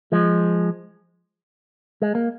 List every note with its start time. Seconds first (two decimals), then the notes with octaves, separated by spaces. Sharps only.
0.12 F3 G#3
2.02 G#3
2.15 A#3